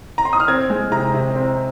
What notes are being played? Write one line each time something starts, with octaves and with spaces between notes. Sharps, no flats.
A#5
C6
D#6
F6
C4 G#6
G#3
C3 A#5
C3
C4